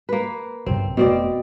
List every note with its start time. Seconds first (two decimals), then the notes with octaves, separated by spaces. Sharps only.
0.09 A#3 B4
0.66 B1 G2 C3 C4
0.97 F1 B2 A3 B3 C4 D5